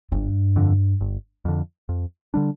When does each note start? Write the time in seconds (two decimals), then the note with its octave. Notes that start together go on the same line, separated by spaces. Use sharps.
0.12 G1 G2
0.56 F2 D3
1.01 G1
1.45 F2 D3
1.89 F2
2.34 D3 G3 D4